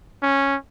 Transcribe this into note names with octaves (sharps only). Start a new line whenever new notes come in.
C#4